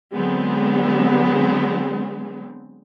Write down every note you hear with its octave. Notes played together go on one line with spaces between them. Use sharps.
D3 F#3 G#3 B3 C4